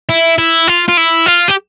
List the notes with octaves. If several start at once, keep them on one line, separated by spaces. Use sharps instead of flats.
E4
E4
F4
F4
E4
F4
G4